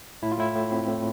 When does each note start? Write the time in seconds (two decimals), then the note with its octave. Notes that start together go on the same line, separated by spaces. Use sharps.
0.23 A2 E4
0.32 F4
0.38 A2 E4
0.56 A2
0.72 C4
0.88 A2